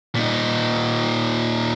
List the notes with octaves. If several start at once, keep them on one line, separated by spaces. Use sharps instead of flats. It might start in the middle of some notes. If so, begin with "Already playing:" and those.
A#2 D#4